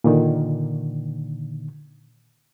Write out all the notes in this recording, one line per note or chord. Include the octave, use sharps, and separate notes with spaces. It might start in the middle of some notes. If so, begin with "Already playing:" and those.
A#2 D3 D#3